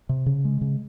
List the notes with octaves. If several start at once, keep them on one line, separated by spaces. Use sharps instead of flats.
C3
C#3
G#3
C#3